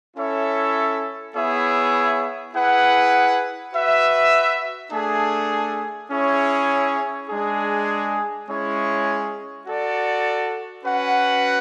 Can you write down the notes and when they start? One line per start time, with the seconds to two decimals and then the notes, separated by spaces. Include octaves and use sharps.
0.16 C#4 E4 A4 C#5 E5
1.35 B3 E4 G#4 C#5 E5
2.54 E4 G#4 B4 F#5
3.72 F#4 B4 E5
4.91 A3 D4 G#4
6.10 C#4 E4 G#4 C#5
7.29 G#3 D4 G#4
8.47 G#3 C#4 E4 G#4 C#5
9.66 F#4 A4 D5
10.85 C#4 F#4 B4 F#5